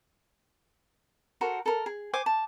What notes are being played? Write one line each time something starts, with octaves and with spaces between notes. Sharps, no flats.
F#4 A4 A#4 C5
A4 A#4
G#4
C5 G#5 D6
A5